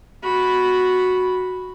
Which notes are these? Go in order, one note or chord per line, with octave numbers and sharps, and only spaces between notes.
F#4 B5